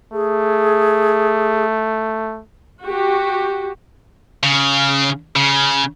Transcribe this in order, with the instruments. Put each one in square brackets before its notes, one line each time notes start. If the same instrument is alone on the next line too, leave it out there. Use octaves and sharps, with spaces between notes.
[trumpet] A3 [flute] G#4
[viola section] F#4 G4
[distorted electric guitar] C#3
C#3